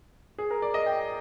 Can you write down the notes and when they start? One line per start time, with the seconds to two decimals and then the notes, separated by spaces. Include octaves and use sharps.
0.38 G#4
0.50 A#4
0.62 D5
0.74 D#5
0.86 G5